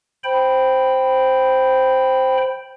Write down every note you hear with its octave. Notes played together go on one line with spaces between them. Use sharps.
C5 G5 B5